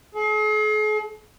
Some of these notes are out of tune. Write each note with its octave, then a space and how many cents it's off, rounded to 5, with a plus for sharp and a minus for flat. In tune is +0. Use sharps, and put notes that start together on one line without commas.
G#4 +45